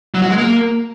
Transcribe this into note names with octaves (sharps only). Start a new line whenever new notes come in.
F#3
F#4
G#3
A#3